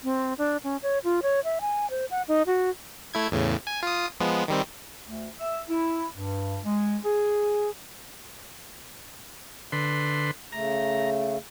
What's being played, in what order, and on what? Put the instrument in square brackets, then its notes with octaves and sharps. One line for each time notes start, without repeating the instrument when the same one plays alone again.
[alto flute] C4
D4
C#4
C#5
F4
C#5
E5
G#5
C5
F#5
D#4
F#4
[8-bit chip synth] A3 E4 G#6
E2 A2 C#3
G#5
F4 D#6
F3 G#3 B3
D#3 G3 C4
[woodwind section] D2
E5
E4
G2
G#3
G#4
[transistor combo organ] D3 B4 C6
[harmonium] C#3 A3 [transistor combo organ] A#5